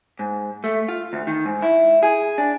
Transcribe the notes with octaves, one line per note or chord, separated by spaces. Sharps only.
G#2
A3
F4
D2
D#3
G#2
E4
G#4
D4